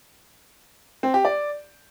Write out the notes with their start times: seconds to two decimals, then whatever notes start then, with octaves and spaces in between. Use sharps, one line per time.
1.03 C4
1.14 G4
1.25 D5